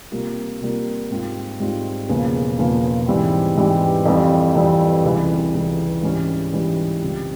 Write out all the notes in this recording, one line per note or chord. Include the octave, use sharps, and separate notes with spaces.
C3 G3 A#3 F4 A#4
C3 G3 A#3 F4 A#4
G#2 G3 C4 F4
G#2 G3 C4 F4
E1 E2 C#3 F3 A#3
E1 E2 C#3 F3 A#3
G#2 E3 G3 C4 G4
G#2 E3 G3 C4 G4
F2 E3 G3 C4
F2 E3 G3 C4
C#2 C3 E3 G3
C#2 C3 E3 G3
G#2 E3 G3 C#4
G#2 E3 G3 C#4
C#2 C#3 G3 C4 F4